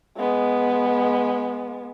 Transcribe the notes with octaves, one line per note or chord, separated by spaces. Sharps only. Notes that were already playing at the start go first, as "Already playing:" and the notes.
G#3 B3